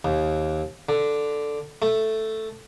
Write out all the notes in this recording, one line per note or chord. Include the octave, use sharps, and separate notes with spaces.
D#2
D3
A3